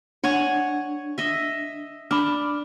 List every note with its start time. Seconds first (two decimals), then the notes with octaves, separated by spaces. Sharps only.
0.24 D4 C#5 F#5 G#5
1.18 D#5 E5
2.11 D4 B5 D6 F6